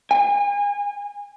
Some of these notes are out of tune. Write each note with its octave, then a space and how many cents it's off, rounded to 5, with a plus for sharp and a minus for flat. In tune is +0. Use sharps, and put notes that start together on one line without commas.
G#5 -35